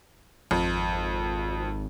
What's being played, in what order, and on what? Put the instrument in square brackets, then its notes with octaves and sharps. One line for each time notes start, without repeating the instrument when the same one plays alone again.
[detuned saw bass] G#1 [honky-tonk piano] F2